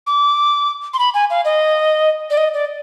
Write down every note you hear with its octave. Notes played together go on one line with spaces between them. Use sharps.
D6
C6
B5
G#5
F5
D#5
D5
D#5
D5